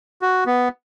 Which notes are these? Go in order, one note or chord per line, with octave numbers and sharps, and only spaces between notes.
F#4
B3